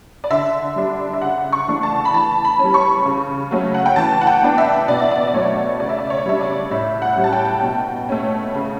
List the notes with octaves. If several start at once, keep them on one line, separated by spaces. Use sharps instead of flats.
D5
D3 E5
G3 D4
E5
C#3 F#5
C#6
E3 A3 D4
A5
B5
E3 A5
B5
G3 C#4
C#6
C#3
F#3 A3 C#4
F#5
G5
E3 A5
F#5
G5
B3 D4
E5
B2 D5
E5
D5
D5
F#3 A3 C#4 C#5
C#3 D5
E5
D5
C#5
G3 D4 E5
D5
A2 E5
F#5
G3 C#4
A5
G5
B2
A3 C#4
C#3